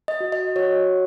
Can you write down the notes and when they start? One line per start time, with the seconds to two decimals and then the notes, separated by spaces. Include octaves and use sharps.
0.08 D#5
0.20 F#4
0.32 D#5
0.56 F#4 C#5